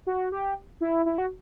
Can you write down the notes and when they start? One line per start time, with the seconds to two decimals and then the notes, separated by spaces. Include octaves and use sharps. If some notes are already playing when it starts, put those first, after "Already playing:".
0.07 F#4
0.32 G4
0.81 E4
1.06 E4
1.18 F#4